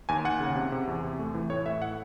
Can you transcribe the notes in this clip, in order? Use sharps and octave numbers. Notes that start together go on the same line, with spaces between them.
D#2 G#5
D#2 F#5
C#3
C3
C3
E2
C3
A3
E3
A2 C#5
A2 E5
F#5